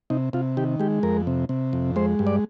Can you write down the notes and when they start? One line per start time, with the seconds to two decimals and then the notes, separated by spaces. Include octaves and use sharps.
0.10 C3 D#4
0.33 C3 F4
0.57 D#3 G4
0.80 G#3 G4
1.03 F2 A#4
1.27 C3
1.49 C3
1.73 F2
1.96 G#3 C5
2.19 G2
2.27 D5